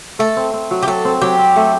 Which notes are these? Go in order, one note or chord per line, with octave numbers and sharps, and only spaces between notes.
A3 A4
C4
C4
F#3
G4
F#3 A4
C4
F#3 G4
C4
A3